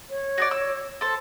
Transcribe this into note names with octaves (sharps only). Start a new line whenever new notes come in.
C#5
F#4 G#4 D5
E6
A4 C5